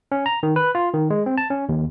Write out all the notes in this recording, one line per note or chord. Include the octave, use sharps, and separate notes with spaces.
C#4
A#5
D#3
B4
F4
D#3
G#3
C4
A5
C#4
D#2